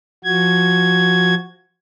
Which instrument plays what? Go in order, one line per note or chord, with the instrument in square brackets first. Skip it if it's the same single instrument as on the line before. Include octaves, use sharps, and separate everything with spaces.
[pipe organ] F3 F#4 G#6